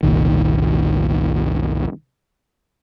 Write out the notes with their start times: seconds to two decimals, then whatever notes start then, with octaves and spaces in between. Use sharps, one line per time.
0.03 F#1 C2 A#2 D#3